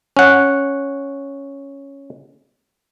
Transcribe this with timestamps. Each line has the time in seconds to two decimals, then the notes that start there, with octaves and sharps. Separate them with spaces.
0.17 C#4 F#5